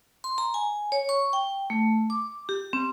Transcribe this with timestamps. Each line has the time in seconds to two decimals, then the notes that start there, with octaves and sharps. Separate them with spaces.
0.24 C6
0.38 A#5
0.54 G#5
0.92 C#5
1.09 C#6
1.33 G5
1.70 A3
2.10 D6
2.49 G4
2.73 C4